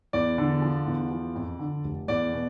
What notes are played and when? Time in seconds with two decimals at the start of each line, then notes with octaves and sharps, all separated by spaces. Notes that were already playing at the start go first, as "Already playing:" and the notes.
0.13 E2 D5
0.38 D3
0.62 F3
0.87 E2
1.11 F3
1.36 F2
1.59 D3
1.84 F1
2.08 E2 D5
2.33 B2